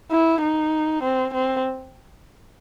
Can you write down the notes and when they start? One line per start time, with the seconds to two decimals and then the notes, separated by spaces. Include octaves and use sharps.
0.11 E4
0.42 D#4
1.03 C4
1.34 C4